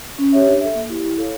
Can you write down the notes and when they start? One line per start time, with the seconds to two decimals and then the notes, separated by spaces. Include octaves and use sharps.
0.19 C#4
0.32 G4 C#5 E5
0.46 D4
0.61 A4 E5
0.75 A#3
0.89 E4 G4
1.03 E4
1.18 A4 C#5 F5